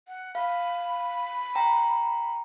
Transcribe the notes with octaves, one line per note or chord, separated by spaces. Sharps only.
F#5
F5 B5
G5 A#5